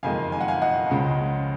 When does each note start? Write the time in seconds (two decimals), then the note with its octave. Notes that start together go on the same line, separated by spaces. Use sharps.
0.03 F#1 F2 D#3 G#3 F5 G#5
0.32 G#5
0.41 F#5
0.48 F5 G#5
0.62 D#5 F#5
0.91 C#2 C#3 F3 G#3